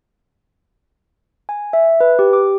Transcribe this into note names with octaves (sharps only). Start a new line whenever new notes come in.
G#5
E5
B4
G4
D6